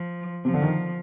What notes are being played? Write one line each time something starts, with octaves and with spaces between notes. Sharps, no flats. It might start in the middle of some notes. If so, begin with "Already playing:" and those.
Already playing: F3
C3 F3
D3
D#3